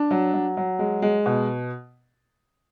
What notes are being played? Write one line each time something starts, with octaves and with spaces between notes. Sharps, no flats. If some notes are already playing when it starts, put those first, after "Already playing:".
Already playing: D4
F#3
F#3
F#3
G#3
G#3
B2